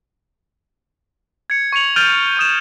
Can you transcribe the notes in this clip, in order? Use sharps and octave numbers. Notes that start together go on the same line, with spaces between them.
G#6 C#7
C#6 G#6 C#7 F7 F#7
F6 G6 A6 D7 D#7 F7
C#6 D#6 E7